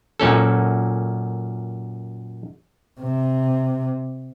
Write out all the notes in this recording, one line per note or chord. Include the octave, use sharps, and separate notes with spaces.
F#2 A#2 C#4 A4
C3